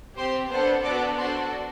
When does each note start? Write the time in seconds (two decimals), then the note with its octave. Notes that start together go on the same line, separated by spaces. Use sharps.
0.17 C4 G4 C5 C6
0.50 B3 D4 A4 C5 C6
0.83 B3 D4 F#4 A4 D5 D6
1.18 D4 F#4 A4 C5 C6